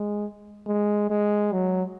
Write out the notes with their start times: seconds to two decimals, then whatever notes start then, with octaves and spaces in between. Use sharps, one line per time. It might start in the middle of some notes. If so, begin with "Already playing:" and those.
Already playing: G#3
0.67 G#3
1.10 G#3
1.53 F#3